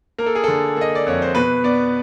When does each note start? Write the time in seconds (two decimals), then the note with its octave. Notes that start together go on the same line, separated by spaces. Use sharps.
0.18 A#3 A#4
0.26 A4
0.35 G#4
0.44 D3 A4
0.77 A#3 D#5
0.95 D5
1.06 F2 C#5
1.22 C5
1.35 B2 B4
1.64 B3 D5